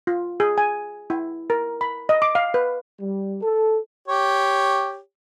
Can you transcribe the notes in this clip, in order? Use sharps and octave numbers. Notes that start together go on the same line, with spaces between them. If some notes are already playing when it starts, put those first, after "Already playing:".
F4
G#4
G#5
E4
A#4
B5
D#5
D6
F5
B4
G3
A4
G4 C#5